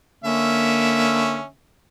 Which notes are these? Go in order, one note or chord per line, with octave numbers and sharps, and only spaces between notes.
D3 A#3 C#4 E5